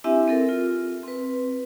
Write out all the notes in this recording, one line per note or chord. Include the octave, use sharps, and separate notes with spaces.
C4 D4 E4 G4 E5 G#5
C4 A4 A#4
F4
C4 B4